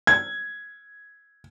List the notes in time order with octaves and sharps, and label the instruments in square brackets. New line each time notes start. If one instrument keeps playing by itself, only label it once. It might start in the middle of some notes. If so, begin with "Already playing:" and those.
[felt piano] G#6